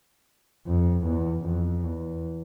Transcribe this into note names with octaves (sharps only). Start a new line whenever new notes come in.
F2
E2
F2
E2